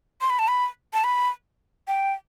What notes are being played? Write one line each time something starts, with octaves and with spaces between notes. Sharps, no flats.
C6
B5
A5
B5
A5
B5
G5